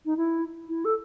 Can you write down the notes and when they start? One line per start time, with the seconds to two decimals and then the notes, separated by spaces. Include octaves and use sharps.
0.06 D#4
0.17 E4
0.69 E4
0.85 A4